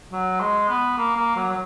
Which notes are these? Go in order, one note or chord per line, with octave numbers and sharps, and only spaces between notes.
F#3
G#3
B3
A#3
A#3
F#3
F#3